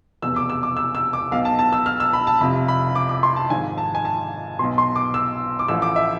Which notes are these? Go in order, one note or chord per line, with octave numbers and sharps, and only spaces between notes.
F1 E2 B2 E6
D6
E6
D6
E6
E6
D6
B1 B2 F5
A5
A5
E6
F6
E6
B5
A5
F1 F2 C3 F3 B5
B5
D6
D6
C6
A5
G#1 G#2 F3 G#5
A5
G#5
A5
B1 B2 C6
C6
D6
E6
D6
A1 A2 F3 E6
D6
E5